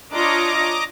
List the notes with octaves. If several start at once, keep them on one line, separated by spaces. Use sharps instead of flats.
D4 F4 C#5 D#5 A#5 D6